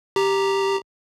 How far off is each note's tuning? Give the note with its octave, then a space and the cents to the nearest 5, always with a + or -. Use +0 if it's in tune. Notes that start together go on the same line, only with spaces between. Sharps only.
G4 +0 A#5 +0